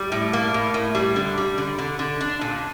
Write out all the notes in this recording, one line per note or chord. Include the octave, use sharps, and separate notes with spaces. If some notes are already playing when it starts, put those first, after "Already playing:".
Already playing: G3
A2
A#3
A2
A2
G3
D3
G3
D3
D3
D3
D4
A#2